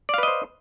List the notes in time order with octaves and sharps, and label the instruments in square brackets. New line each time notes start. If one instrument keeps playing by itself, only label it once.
[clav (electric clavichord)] D5
F5
B4
D#5
C5